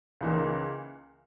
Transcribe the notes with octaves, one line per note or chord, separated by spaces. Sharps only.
C#2 C#3 E3 A#3 D#4